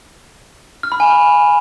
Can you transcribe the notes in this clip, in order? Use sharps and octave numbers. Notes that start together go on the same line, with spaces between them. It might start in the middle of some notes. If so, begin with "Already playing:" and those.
F6
B5
G#5